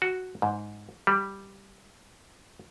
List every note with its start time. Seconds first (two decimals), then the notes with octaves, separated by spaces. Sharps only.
0.02 F#4
0.42 G#2
1.07 G3